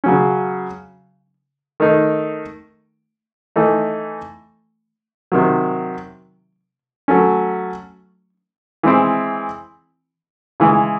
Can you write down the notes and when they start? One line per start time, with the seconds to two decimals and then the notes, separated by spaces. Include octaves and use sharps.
0.04 C#3 F#3 C#4
1.80 D#3 A3 D#4
3.56 E3 A3 D#4
5.32 C3 D#3 F#3
7.08 F#3 A3 C#4
8.83 E3 G#3 C4 E4
10.60 C#3 E3 G#3